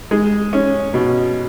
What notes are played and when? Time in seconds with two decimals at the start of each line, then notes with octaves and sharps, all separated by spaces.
0.11 G#3
0.53 C#4
0.94 B2